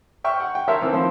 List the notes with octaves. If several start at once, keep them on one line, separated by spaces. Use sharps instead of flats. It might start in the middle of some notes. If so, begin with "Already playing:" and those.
E5 G5 C#6 F6
F#5
G5
A#4 C#5 E5 A5 C6
D#3 E3 C4
F3 C4